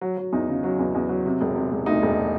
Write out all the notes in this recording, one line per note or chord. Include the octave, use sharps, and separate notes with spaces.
F#3
F#3
E2 D#4
C#3
F#3
E2
E2
F#3
C3
E1
C3
E1
D2 D#4
E1